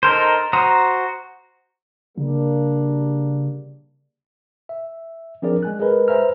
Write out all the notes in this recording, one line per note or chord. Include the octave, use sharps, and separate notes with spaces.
D#4 A4 A#4 C5
F#4 C5 A#5 D#6
C#3 G3 A#3 D4
E5
F3 C4 D4 G#4 A#4 D5
G#3 G#5 F#6
G#3 G#4 A#4 B4
B4 C5 E5 G#5 A#5 F6